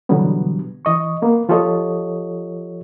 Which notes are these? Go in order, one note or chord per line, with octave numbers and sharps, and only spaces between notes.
B2 D3 E3 F#3 G3 B3
E3 D#5 C#6
A#3 B3
F3 F4 G4 A4 C#5 D#5